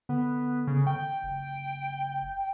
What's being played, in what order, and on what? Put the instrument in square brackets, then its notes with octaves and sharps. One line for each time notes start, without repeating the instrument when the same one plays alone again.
[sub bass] D3 [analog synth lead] B3
[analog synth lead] C#3
G5
[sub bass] F#1